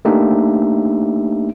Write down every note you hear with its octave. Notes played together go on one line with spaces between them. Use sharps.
A3 A#3 D4 D#4 G4 E5